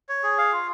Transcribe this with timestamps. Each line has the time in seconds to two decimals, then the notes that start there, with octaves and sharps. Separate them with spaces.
0.09 C#5
0.24 G#4
0.38 F5
0.52 F4